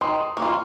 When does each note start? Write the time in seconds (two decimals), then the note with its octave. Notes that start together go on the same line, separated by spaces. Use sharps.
0.01 D#3 C6 D#6
0.37 A#3 C#6
0.42 F4 C6